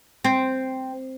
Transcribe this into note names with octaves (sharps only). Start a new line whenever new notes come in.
C4